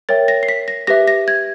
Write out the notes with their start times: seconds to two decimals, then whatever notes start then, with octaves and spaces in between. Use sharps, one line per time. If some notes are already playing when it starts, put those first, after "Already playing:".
0.09 A#4 C#5 E5 G5 A6
0.28 A#6
0.43 C7
0.49 B6
0.68 A#6
0.87 G4 B4 E5 A#6
1.08 A#6
1.28 G#6